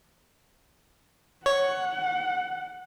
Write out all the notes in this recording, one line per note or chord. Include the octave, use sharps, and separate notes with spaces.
C#5 F#5